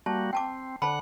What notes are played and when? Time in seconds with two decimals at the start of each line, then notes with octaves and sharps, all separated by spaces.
0.06 G3 A#3 F#4 A5
0.33 C4 G5 A5 D6
0.82 D3 C5 F#5 A5 B5